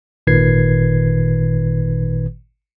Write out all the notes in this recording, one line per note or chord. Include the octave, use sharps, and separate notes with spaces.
G#1 A#2 D#3 B4 G#6 C7